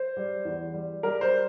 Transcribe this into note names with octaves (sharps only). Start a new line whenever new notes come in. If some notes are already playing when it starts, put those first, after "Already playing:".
Already playing: C5
G3
E2
G3
G3 A#4
C5